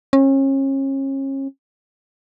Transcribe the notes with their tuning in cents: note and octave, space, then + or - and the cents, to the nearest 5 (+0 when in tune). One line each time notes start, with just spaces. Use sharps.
C#4 -35